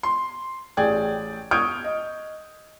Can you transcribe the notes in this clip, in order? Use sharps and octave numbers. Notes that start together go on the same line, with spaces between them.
C6
A1 G#4 D5 G5 G#6
C#6 D#6 F6 G6 G#6 D7
D#5